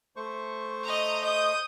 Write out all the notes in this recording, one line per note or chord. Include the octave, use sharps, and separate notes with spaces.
A3 C5 C#6
D#5 A#5
D#5 D#6 G6